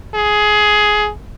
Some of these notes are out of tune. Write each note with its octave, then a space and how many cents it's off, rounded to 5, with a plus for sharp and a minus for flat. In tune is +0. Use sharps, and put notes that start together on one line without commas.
G#4 +15